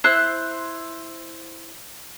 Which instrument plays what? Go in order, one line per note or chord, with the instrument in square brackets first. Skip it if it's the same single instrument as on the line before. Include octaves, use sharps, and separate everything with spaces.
[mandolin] E4 C5 E6 F#6